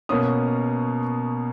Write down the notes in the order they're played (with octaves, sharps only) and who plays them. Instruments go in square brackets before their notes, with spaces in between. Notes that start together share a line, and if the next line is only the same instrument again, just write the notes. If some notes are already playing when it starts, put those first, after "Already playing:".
[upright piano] B2 A#3 C#4 D#6